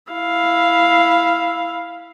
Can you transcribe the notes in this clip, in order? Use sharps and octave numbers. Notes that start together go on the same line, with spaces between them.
E4 F5